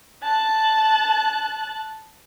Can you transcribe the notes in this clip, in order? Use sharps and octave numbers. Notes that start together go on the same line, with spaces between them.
A5 F#6